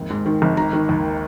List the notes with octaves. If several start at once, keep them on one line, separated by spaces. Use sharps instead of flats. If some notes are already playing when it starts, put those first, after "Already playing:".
Already playing: G#1 D#2
G#2
D#3
G#1
D#3 A#5
D#3
D#2